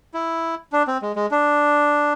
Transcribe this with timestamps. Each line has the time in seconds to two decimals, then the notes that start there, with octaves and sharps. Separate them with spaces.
0.14 E4
0.73 D4
0.87 C4
1.02 G#3
1.16 G#3
1.31 D4